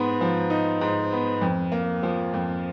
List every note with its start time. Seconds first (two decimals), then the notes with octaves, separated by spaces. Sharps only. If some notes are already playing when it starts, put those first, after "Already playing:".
Already playing: G#2 B3
0.21 F3
0.50 D#4
0.81 G#2
1.12 B3
1.41 F2
1.72 A#3
2.03 F3
2.34 F2